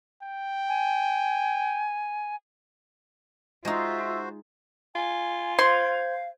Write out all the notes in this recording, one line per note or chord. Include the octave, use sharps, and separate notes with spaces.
G5
G#5
G#3 D#4 F4 F#4 C5 E5
F4 G#5
C5 F5 C6 G#6